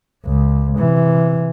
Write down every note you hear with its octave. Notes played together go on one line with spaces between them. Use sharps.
C#2
C3 E3